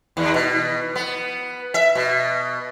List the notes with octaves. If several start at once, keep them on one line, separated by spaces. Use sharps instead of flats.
D#2
B2
B3
E5
B2